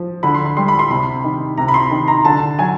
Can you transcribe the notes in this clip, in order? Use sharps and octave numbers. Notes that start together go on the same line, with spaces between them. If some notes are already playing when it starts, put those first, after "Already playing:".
Already playing: F3
D3 B5
C6
B5
G3 C6
B5
C6
C3 B5
D#3
C3 A#5
B5
C6
D#3
A#5
D3 A5
F#3 G#5